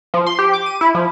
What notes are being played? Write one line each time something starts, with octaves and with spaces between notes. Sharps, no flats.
F3
C6
G4
D6
D#7
E4
F3